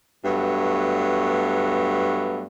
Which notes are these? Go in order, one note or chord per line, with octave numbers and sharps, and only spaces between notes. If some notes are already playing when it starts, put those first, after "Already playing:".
G2 F#3 A3 B3